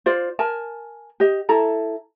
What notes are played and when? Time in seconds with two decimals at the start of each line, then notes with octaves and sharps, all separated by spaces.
0.06 F4 C5 D5
0.39 A#4 G#5 A5
1.20 G4 D#5
1.49 E4 A4 A#5